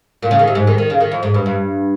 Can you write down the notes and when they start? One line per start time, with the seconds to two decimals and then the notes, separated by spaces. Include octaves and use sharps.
0.22 A#2
0.31 C#3
0.39 D#3
0.48 C3
0.55 G#2
0.67 D#3
0.78 D#3
0.90 C#3
1.00 D#3
1.12 F2
1.23 G#2
1.34 G2
1.46 G2